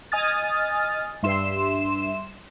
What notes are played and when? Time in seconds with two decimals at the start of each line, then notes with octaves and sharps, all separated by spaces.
0.12 D#5 G#5 D#6 F6 A6
1.23 G2 E5 C6 E7